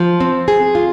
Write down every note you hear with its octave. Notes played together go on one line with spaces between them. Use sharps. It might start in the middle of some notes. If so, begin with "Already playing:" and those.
Already playing: F3
C4
G#4
F4